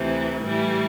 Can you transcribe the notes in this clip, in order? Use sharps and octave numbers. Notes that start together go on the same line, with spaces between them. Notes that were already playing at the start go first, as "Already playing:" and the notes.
Already playing: D2 C3 E3
A2 E3 G3